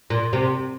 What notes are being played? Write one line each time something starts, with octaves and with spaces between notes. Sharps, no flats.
A#2
C3